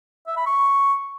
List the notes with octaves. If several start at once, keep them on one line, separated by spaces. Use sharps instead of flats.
E5
B5
C#6